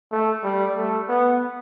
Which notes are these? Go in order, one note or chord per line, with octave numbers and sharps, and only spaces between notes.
A3
G3
A3
B3